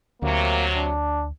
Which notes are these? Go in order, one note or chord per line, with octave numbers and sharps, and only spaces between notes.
D2 C3 F#3 A#3
D4